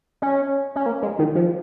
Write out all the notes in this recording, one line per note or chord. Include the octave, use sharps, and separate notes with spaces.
C#4
C#4
A#3
G#3
D#3
F3